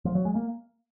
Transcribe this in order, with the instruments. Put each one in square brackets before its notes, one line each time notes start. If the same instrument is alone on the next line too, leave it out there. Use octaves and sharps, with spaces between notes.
[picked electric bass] F3
F#3
G#3
A#3